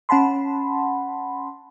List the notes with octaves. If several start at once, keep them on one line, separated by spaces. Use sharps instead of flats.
C#4 F#5 A5 B5 C6